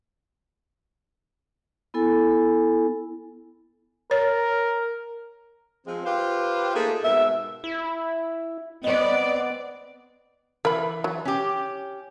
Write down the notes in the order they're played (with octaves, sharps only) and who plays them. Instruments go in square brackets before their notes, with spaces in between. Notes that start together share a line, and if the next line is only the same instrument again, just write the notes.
[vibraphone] B3 E4 A4 G#5
[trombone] A#4 [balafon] C#5
[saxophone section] F3 G#3 C4
F4 G4 B4 C5 F5
A3 A#3 D#4 F4 G4 G#4
G#2 B2 A#4 E5
[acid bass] E4
[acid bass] B3 [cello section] C4 D5 [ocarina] D#5
[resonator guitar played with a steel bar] E3 [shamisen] A#4 B5
[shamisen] F#3
[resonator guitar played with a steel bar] C#4 G4